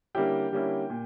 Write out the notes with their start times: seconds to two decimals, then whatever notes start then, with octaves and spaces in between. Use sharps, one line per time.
0.15 D3 G3 A#3 C#4 E4 G4 G5
0.52 D3 G3 A#3 C#4 E4
0.90 A#2